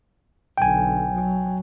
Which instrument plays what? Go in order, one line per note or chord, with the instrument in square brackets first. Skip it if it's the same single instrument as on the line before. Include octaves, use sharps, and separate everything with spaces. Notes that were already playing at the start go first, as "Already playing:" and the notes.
[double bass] B1 D3 [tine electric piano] G5 G#5
[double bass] F#3